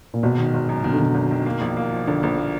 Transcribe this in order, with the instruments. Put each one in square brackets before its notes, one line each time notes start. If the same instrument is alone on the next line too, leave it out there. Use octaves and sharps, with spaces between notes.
[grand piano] A#2
[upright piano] G#1 [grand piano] B2
[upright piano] D#3
G#1
F#2
[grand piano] B2 [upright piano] D#3
[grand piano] D3
[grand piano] B2 [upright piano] D#3
[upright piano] G#1
D#3
A#3
A#1
A#3
F3
[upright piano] A#1 [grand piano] D3
[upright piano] A#1
A#3